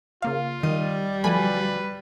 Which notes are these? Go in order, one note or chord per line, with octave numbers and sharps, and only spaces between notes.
C#3 A#3 F4 F5
D#3 G3 D#5
D2 F3 F#3 A3 B4 G#5 B5